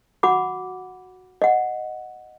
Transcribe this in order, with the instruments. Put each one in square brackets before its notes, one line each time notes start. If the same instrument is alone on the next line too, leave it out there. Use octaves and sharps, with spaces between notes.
[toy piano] F#4 F#5 B5 D6
D#5 F#5